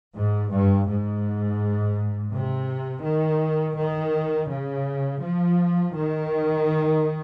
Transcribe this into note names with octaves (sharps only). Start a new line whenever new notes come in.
G#2
G2
G#2
C3
D#3
D#3
C#3
F3
D#3